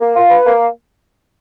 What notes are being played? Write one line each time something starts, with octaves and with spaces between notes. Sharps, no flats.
A#3
F4
B4
A#3